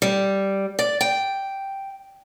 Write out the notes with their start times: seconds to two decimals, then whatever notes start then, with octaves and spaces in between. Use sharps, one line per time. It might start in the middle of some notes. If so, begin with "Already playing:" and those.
0.02 G3
0.79 D5
1.01 G5